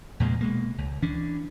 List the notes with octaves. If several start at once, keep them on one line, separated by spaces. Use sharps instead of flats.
E2 A#2 C#3 G#3
B2 G#3 A#3
C#2
E3 C#4 D4